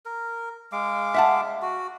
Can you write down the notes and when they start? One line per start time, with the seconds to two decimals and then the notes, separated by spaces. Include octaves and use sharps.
0.06 A#4
0.72 G#3 F5 D6
1.14 E5 F#5 A5
1.62 F#4